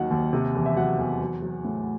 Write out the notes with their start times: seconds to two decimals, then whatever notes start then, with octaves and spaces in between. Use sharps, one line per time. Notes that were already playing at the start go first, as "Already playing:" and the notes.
Already playing: D#2 D#3 F#3 F#5
0.11 D#2
0.33 C3
0.55 E2
0.66 E5
0.76 F#3 F#5
0.98 E2
1.21 F#3
1.42 F#3
1.65 A2